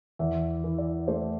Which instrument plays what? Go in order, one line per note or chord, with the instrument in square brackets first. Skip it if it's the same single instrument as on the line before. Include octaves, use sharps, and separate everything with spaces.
[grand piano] E2 E5
E3
D5
A3 C5